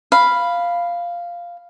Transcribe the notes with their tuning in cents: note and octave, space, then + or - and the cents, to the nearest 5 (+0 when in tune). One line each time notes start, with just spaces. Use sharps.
F5 -5 B5 +0